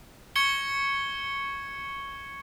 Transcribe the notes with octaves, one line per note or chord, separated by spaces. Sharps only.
C#6 G#6 C#7 G7